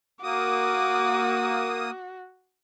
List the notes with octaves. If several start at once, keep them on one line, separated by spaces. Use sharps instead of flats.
A#3 F#4 D6 D#6